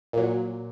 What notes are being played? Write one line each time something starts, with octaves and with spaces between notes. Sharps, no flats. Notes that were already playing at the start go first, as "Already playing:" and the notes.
A#2 F#3